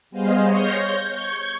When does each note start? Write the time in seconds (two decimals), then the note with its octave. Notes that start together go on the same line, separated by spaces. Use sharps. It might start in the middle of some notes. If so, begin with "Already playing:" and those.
0.11 G3 B3 G#4 C5 D#5 F5
0.44 C#5 C6 C#6 F6 G6 A#6
0.81 G6
1.11 C#6 G6 G#6